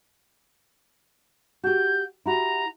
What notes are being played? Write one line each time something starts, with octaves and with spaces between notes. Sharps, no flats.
F#4 G4 G6
E4 F#4 G4 A#5